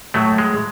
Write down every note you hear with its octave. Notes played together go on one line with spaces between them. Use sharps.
A2 F#3 A3
G#3